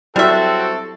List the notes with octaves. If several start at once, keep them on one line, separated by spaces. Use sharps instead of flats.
F#3 G3 C4 E4 F#4 A4 E5